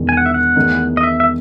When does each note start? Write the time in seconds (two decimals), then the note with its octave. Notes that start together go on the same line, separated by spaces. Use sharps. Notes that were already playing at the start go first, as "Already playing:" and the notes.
Already playing: E1 E2 D#3
0.09 G#5
0.17 F#5
0.26 E5
0.34 F#5
0.56 E2 D#3 A3 D#4
0.97 D#5
1.03 E5
1.20 E5